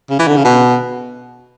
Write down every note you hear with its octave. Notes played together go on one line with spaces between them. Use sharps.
C#3
E3
D3
C#3
B2